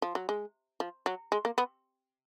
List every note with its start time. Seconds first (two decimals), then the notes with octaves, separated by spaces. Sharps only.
0.02 F3
0.15 F#3
0.29 G#3
0.80 F3
1.06 F#3
1.32 G#3
1.45 A#3
1.58 B3